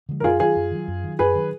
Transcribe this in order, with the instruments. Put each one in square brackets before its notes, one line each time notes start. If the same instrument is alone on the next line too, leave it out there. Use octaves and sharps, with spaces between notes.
[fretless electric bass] D3 F3 G#3
[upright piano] A#4
[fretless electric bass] F#2 [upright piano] F4 G#4
[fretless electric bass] D#3 F#3 [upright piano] F4 G#4
[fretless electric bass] F#2
D#3 F#3
F#2
D#3 F#3
[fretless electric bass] F#2 [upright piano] G#4 B4
[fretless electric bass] D#3 F#3